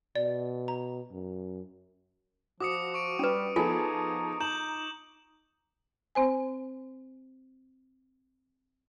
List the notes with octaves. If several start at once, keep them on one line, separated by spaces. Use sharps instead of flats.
B2 D5
A#5
F#2
F3 F#4 D6 D#6 C#7
C#6 D7
G3 C#4 B4
F3 B3 D#4 F4 G#4 A4 G#5
D#4 A#5 G6 E7 F#7
C4 C5 G#5